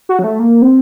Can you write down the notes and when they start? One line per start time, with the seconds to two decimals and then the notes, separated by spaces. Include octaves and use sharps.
0.09 F#4
0.19 F#3
0.24 A3
0.39 A#3
0.62 C4